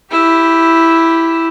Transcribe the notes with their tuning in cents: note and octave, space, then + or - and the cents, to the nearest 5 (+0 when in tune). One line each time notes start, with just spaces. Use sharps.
E4 +0 G4 +0